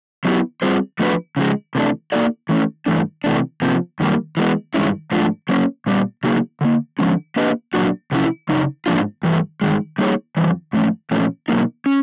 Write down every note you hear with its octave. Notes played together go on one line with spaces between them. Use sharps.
F#3 B3 E4 G4
G3 C4 F4 G#4 C5
F3 A3 D4 F#4 B4
C#3 F3 G#3
C3 E3 A3 D4
A#3 D#4 F#4 A4 D5
E3 A3 C#4
G2 E3 A3 D4
C3 E3 A3 D4
C3 F3 A#3
F#2 D#3 G3 A#3
E3 G#3 B3
G2 D#3 G#3 C#4 E4
G#2 F3 A3 D4 F4
F#3 A#3 C#4
A#2 G3 B3
C#3 F#3 A#3 D#4 G#4
D3 G3 A#3
D3 F3 G#3 C#4
A#3 D4 G4 B4 D#5
A#2 F#3 A#3 D4 F#4
C3 F3 A3 C#4 E4
F#2 C#3 D#4
G#2 F3 A#3 D4 F4
G2 E3 A3
G2 D#3 G#3
G3 A#3 D#4 G#4 C#5
F2 C3 E3 G3
G#2 F3 A3 C#4
A#2 F3 A3 C#4
B2 F#3 A#3 D#4
C#4